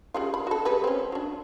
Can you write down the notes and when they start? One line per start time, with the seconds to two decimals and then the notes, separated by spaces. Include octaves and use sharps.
0.14 C#3 G3 F4
0.34 B5
0.47 F#4 A4
0.65 G3 G#3 B4
0.84 C4 C#4
1.12 F#3 D4